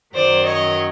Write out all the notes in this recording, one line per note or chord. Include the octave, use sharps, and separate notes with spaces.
F#2 D#3 F#3 C5 D5
C#5 D#5